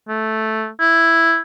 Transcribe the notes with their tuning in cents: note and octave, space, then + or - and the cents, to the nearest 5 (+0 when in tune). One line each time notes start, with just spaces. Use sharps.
A3 -5
E4 +5